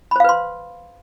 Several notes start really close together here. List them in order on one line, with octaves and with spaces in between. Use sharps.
B5 C5 F5 B4 C6